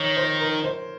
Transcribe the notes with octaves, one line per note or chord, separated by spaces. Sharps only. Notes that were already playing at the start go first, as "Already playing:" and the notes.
Already playing: D#3 C#5
C5
A#4
C5